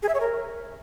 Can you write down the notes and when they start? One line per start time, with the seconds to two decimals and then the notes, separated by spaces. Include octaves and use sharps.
0.03 G#4
0.09 E5
0.14 C#5
0.20 A#4